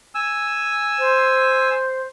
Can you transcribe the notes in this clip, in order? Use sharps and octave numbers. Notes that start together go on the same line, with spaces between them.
G#5 E6
C5